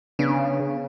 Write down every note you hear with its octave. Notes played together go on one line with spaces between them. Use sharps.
C#3 B3 D4